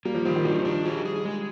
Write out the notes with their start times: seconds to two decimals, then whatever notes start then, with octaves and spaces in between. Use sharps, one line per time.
0.05 G3 A#3
0.15 F3
0.25 D#3 C5
0.36 D#3
0.45 G3 D4
0.65 D4
0.85 G3 G#4
1.05 G#4
1.25 G#3